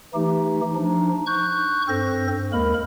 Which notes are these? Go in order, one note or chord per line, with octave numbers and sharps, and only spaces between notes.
E3 A3 D#4 G4
F3 D4 D#4
C#6 F#6 G6
G2 C4 A4 C5 A#6
D#2 G#3 A#3 A#4 B5